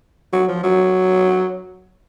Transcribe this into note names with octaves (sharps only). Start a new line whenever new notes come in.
F#3
F3
F#3